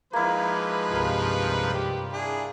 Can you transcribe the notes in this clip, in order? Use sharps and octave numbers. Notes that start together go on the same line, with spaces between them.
F3 G#3 A#3 D#4 E4 B4
C2 G2 F4 A#4
G4
D4 E4 G#4